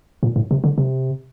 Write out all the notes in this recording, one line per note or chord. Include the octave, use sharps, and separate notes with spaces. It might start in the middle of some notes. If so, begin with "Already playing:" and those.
A#2
A2
C3
D3
C3